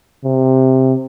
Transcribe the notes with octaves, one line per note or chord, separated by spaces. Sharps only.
C3